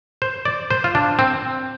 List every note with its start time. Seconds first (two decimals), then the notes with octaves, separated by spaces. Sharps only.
0.22 C5
0.45 D5
0.70 C5
0.84 F4
0.95 D4
1.19 C4